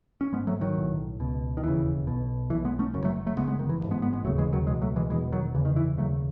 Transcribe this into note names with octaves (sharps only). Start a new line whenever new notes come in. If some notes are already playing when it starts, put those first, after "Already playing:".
C#4
G#1 G#2 G#3 B3
F#3 A3
D#3 F#3
B1 A2
C#2 B2
D#3
E1 D#2 C#3 E3
B1 B2
B1 B2 E3
G#3 B3
A3 C#4
F#1 F#2 C#3
F#3 A3
F#3 A3
F#1 F#2 C#3 G#3 B3
G#3 B3
D#3
E3
A1 G#2
G#3 B3
G#3 B3
G#3 B3
E1 D#2 C#3 F#3 A3
E3 G#3
D#3 F#3
C#2 B2 E3 G#3
F#3 A3
E3 G#3
E1 E2 B2 E3 G#3
D#3 F#3
F#1 E2 C#3 E3
D#3
E3
E1 D#2 C#3 F#3 A3